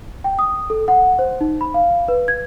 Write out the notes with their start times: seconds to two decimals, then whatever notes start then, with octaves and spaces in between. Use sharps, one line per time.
0.24 G5
0.39 D#6
0.70 A4
0.88 F#5
1.19 C5
1.41 D#4
1.61 B5
1.74 F5
2.08 B4
2.28 G#6